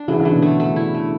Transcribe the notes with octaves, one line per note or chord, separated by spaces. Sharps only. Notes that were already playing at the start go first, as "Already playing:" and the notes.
Already playing: D4
C#3 E3 F#3
C#3 E3
F#3
B2 D3
A3
A3
E4
A3